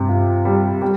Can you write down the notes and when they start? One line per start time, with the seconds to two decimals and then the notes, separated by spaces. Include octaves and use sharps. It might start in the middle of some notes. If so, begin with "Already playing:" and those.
Already playing: G2 C3
0.09 F4
0.45 G3
0.82 G3